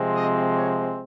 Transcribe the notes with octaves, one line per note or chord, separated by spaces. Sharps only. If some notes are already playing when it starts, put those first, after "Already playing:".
Already playing: C3 F3 G#3 C4
D#5
C#5